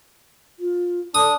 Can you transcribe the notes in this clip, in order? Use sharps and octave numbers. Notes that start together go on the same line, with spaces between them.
F4
D4 A4 D#6